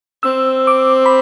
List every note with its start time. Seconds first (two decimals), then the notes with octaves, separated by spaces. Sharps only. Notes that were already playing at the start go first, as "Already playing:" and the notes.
0.23 C4 E6
0.67 D6
1.06 B5